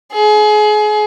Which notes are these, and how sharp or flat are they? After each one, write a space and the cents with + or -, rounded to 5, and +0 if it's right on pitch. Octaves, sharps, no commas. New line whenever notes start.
G#4 +30